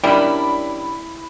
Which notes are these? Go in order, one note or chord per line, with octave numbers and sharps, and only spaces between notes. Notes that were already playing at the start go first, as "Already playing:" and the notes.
G3 C#4 D4 E4 A#4 B5